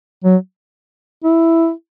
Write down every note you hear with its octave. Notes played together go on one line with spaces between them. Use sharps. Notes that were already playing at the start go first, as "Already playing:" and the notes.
F#3
E4